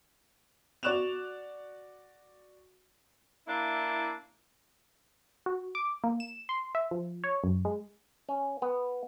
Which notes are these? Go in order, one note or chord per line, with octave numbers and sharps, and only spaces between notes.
F#4 D5 C#6 F#6 E7 F7
A#3 D4 E4
F#4
D6
A#3
E7
C6
E5
F3
C#5
F#2
G#3
C#4
B3